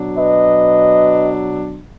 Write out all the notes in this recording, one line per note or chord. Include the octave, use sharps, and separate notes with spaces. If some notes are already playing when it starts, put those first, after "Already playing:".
Already playing: B2 F#3 D4
B4 D#5